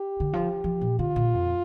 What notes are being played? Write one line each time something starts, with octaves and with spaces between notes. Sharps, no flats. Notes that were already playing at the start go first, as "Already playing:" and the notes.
Already playing: G4
D3
F3
F3
A#2
D3 F4
A#2
F2